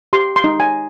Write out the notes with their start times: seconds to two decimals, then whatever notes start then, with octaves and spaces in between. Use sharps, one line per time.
0.13 G4 C6
0.36 C6
0.44 D#4
0.60 G#5